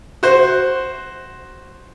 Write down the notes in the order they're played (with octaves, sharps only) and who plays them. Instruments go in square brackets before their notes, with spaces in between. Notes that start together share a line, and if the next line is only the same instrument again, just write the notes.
[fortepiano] F#4 C5